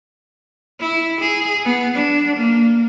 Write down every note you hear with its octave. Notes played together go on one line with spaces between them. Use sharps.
E4
G#4
B3
D4
A#3